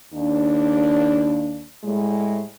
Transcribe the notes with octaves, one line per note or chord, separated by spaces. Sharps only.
D#2 D4
A2 G3 G#3